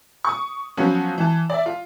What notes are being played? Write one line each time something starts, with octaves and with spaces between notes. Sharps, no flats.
C#6 D#6
F3 F#3 B3 C#4 F4 F#4
E3 A5
D5 E5
F4